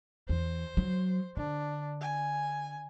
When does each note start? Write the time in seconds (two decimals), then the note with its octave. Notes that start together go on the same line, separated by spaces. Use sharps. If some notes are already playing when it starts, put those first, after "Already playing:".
0.29 E2 C5
0.77 F#3
1.37 D3 D4
2.01 G#5